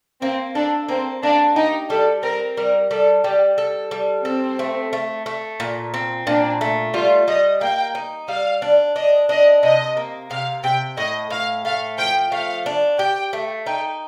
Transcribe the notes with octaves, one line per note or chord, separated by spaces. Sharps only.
A#3 C4
D4 A4
A#3 C4
A#3 D4
D#4 G4
G3 A4
C4 A#4
G3 A#4
G3 A4
G3 G4
A4
G3
C4 A4
A3
A3
A3
A#2
C4
A#2 D4
A3
G3 F4
G3 D#5
A#3 G5
D#4
G3 F5
D4
D4 D#5
D4 D#5
C3 D#5
A#3
C3 F5
C3 G5
A2 D#5
A2 F5
A3 F5
F3 G5
A3 F5
D4
G4 G5
A3
D#4 G5